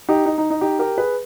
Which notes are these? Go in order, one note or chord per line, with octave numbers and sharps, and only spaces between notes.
D#4 G4
D#4
D#4
D#4
D#4 G4
G4 A#4
G#4 B4